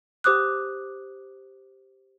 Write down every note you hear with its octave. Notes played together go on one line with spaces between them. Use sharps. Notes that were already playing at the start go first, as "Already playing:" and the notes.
G4 C5 D6 D#6 F#6